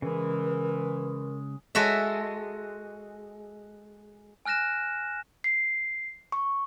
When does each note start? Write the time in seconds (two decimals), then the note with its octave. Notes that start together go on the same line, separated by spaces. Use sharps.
0.02 C#3 E3 G#3 A#4
1.75 G#3 F#4 A4 E5
4.45 G#5 F6 F#6 A#6 E7
5.44 C7
6.32 C#6